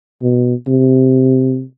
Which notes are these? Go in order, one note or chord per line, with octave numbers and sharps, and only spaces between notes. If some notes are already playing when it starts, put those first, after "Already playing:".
B2
C3